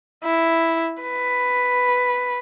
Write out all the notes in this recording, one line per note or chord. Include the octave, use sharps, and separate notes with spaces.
E4
B4